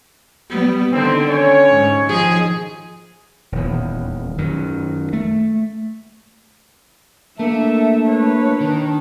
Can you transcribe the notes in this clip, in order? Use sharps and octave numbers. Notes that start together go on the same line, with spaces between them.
G3 B3
D3 D#3 C4
C#4 C#5
G#2
D#3 F3 G#4
D#1 E2
F#2 D#3
A3
A3 A#3 D4 E5
B4 C#5
D#3